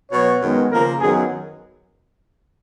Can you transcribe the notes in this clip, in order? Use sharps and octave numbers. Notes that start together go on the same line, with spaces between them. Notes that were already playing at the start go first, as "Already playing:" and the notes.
B2 F#3 B3 C#5
F#2 D#3 G#3 B3
C#3 F3 A#3 A#4
F#2 D#3 F#3 B3 G#4